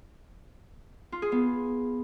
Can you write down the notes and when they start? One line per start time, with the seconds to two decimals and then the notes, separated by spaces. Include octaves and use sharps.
1.12 F4
1.22 G#4
1.32 B3